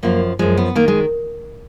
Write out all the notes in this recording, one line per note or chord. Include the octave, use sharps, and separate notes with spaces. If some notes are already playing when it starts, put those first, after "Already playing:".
F#2 F3 A#3
F#2 F3 G#3
B3
D#3 A#3
G#3